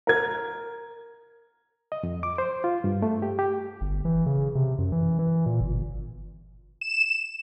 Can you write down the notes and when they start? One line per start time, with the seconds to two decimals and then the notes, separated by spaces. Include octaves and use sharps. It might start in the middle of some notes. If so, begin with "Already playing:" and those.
0.07 A#4 G#6
1.92 D#5
2.03 F2
2.23 D6
2.38 C5
2.64 F4
2.84 G2
3.02 A3
3.22 G4
3.39 G4
3.81 G1
4.05 E3
4.26 C#3
4.55 C3
4.79 F#2
4.92 E3
5.19 E3
5.46 A#2
5.61 G1
6.81 E7